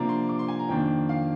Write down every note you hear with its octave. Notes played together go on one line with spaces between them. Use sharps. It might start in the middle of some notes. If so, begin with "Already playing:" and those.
Already playing: C3 F3 A#3 D4 A#5
C6
D6
C6
G#5
A#5
F2 D#3 A#3 D4 G5
F5